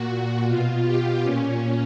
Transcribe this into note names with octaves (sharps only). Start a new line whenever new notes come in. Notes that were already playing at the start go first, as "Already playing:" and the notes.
Already playing: A#2 F#4
B2 F4
G4
A#2 C#4